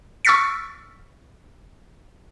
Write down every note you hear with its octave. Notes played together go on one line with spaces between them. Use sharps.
C#6 E6 F6 A6 B6 C#7